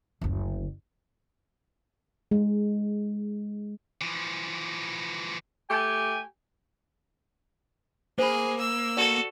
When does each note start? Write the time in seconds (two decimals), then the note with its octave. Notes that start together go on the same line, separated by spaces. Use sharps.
0.21 F#1 D2
2.31 G#3
4.01 E3 F3
5.70 A3 G4 G5 G#5
8.19 A#3 G#4 C5 B5
8.60 E6
8.97 F#4 A4 D5 C#6